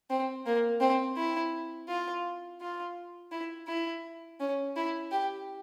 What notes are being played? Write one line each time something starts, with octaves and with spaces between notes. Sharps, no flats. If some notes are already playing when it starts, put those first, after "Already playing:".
C4
A#3
C4
E4
F4
F4
E4
E4
C#4
E4
G4